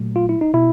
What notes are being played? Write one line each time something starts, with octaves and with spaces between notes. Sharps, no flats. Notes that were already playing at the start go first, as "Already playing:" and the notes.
Already playing: A#2 F#3 A3
F4
E4
D#4
B2 E4